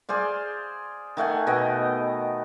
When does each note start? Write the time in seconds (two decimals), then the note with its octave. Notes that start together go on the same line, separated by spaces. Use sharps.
0.09 G#4 C5 D5 F5
1.17 D#3 A3 F#5 G#5
1.47 B2 B3 D#5 G5